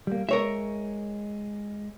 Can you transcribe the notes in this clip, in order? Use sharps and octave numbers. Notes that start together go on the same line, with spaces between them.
G3 A#3
G#3 A#4 C#5 E5